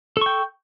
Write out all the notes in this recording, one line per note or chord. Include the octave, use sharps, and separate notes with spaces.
A4 G5 C#6